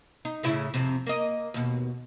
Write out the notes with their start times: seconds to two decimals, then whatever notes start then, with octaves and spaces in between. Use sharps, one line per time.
0.25 D#4
0.43 A2 C#3 E4
0.74 F2 C3
1.07 A#3 D#5
1.54 D#2 B2